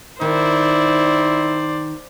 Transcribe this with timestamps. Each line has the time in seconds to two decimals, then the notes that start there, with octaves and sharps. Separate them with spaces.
0.21 D#3 E4 C5 D5